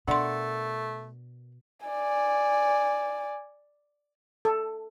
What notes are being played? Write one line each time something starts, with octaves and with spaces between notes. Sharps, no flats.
B2 A3 D4 A#4 D5 F#5 C6
D5 G#5
A4